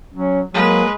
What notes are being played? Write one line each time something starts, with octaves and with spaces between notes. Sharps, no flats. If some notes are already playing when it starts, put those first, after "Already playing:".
F#3 C#4
F#3 G#3 A#3 B4